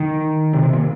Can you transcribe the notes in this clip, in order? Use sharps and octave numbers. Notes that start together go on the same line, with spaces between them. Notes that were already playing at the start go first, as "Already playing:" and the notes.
Already playing: D#3
C3
C3
A#2